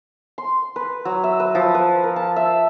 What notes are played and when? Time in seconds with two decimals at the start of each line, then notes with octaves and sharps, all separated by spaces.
0.38 C6
0.76 B4
1.05 F#3
1.24 E5
1.40 B4
1.55 F3
1.75 B4
2.04 A#4
2.16 A5
2.36 E5